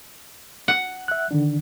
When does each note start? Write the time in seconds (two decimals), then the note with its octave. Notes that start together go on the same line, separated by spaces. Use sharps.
0.68 F#5
1.08 E5 F#6
1.31 D3 D#3 D4